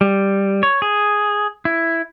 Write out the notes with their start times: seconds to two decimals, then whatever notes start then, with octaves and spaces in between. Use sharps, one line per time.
0.01 G3
0.63 C#5
0.82 G#4
1.65 E4